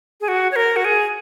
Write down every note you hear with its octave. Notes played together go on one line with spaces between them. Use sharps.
G#4
F#4
C#5
A#4
F#4
G#4